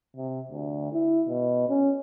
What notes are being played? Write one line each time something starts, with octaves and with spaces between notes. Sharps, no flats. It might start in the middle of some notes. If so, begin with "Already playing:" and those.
C3
D2
E4
B2
C#4